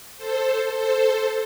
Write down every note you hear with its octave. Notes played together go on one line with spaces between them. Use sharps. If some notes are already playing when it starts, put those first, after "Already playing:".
A4 C5
A4 C5